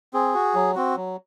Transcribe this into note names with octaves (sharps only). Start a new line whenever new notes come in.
C4 G#4
F#4
F#3
C4 F#4
F#3